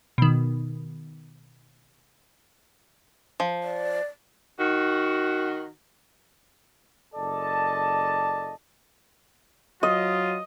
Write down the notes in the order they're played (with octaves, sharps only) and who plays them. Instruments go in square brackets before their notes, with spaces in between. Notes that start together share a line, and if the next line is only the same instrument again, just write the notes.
[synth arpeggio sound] B2 D#3
[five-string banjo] F3
[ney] D5
[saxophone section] D#3 F#4
[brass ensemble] F#1 A4 D5 D#5 A5
[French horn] F#3 [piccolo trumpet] F4 [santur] D#5